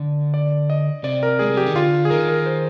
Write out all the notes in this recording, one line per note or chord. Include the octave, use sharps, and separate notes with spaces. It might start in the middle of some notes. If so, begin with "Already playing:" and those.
Already playing: D3
D5
D#5
C3 D5
A#4
G#3 G#4
G3
F3 G4
D#3
D3 F4
G#4
D#3 A#4
A#4
C5